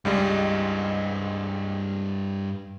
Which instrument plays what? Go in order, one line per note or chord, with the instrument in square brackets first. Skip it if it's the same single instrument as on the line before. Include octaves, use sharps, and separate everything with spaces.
[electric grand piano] C#2 G3 G#3 [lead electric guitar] G2 D#5